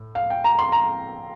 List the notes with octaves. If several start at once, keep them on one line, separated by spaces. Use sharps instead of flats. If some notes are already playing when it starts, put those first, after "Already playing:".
Already playing: A2
F5
G5
A#5
C6
A#5